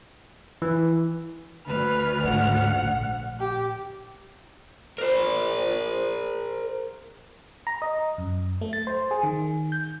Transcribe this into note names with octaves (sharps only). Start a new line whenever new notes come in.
E3
D2 B4 F6
G#2 F#5
A#1
G4
A#4 C5
A#5
D#5
F#2
A3
A6
C5
G#4
D#3
G6